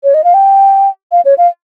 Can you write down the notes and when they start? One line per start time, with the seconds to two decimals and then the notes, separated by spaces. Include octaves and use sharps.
0.04 C#5
0.14 D#5
0.24 F5
0.34 G5
1.12 F5
1.25 C#5
1.38 F5